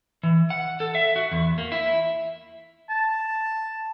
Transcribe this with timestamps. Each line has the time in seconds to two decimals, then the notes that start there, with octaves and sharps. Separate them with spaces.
0.23 E3
0.50 F#5
0.80 A4
0.95 E5
1.16 F#4
1.32 E2
1.58 A#3
1.72 E4
2.89 A5